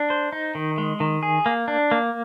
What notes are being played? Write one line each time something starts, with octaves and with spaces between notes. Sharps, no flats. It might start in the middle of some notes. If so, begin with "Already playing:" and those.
Already playing: D4
C5
D#4
D#3
G#3
D#3
G#4
A#3
D4
A#3